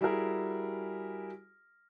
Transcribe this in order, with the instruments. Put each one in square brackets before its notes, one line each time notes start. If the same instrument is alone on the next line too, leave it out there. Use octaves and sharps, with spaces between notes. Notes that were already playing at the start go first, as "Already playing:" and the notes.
[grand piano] G3 E4 F#4 G#4 A#4